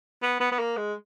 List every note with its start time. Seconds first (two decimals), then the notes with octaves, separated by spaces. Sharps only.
0.22 B3
0.40 B3
0.52 B3
0.59 A#3
0.77 G#3